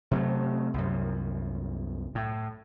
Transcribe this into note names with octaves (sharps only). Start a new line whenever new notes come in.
C3 F#3 A3
C2 F#2
A2